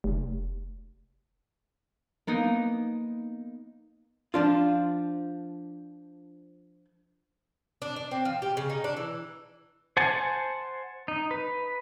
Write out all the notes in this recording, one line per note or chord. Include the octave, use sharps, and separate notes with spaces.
F1
A#3 B3 D#4
F3 D4 F4
D4
D4
C4
F3
G4
C#3
D#4
D4
E3
C5 F#5 G#5 A5
D#4
B4